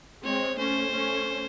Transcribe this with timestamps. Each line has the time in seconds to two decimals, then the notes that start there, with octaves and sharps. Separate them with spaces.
0.24 G#3 C4 C#5
0.58 A3 C#4 C5
0.91 A3 C#4